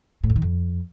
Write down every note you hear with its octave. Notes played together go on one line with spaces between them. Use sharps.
A2
F2
D#3
F2